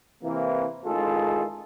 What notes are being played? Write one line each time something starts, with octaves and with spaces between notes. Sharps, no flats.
C3 E3 A#3
A1 D#3 G#3 F4 G#4 A4